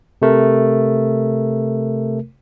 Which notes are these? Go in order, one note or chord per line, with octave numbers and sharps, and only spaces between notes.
C3 A3 A#4